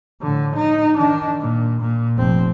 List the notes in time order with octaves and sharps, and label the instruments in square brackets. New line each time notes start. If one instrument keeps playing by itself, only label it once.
[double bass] A2 D3
D#4
D#3 D4
A#2
A#2
F1 C4